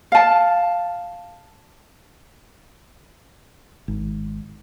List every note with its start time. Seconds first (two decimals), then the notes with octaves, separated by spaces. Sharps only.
0.12 F5 A5
3.88 G#1